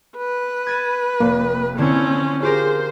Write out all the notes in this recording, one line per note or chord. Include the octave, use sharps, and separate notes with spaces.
B4
G#6 A6 D#7
F1 A#3
D3 C4 C#4 E4 G#6
F4 G4 G#4 A#4 C5